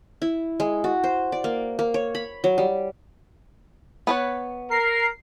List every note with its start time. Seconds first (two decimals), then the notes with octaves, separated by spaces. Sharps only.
0.22 E4
0.60 G#3
0.84 F#4
1.04 C5
1.32 D5
1.44 A#3
1.79 A#3
1.94 C#5
2.15 B5
2.44 F#3
2.58 G3
4.07 B3 B4 C#5
4.71 A#4 C7